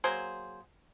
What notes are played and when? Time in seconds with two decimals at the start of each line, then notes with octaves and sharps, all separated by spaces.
0.04 F#3 A#3 G#4 C5